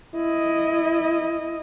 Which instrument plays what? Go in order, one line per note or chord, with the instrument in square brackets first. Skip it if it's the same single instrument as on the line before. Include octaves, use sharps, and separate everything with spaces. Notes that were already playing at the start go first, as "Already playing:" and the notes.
[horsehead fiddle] E4 D#5